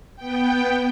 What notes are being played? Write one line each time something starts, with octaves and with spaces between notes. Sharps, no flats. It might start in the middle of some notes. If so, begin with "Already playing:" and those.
B3 G5